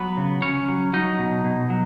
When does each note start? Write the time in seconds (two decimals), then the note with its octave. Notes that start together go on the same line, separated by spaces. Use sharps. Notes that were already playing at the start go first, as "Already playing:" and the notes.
Already playing: F#3 B3 B4
0.17 C#3
0.42 C#3 C#4 C#5
0.68 F#3
0.93 F#3 D#4 D#5
1.19 B2
1.44 B2
1.70 F#3